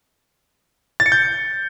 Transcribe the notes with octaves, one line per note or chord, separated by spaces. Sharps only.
A6
C#7
G6